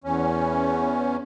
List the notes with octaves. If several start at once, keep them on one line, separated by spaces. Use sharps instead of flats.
E2 C#4